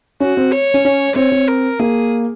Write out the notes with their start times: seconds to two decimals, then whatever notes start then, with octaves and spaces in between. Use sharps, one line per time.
0.20 C#4 F#4
0.37 C4
0.52 C#5
0.74 C#4
0.85 C#4
1.16 C4 C#5
1.32 C4
1.48 A#4
1.79 A#3 G#4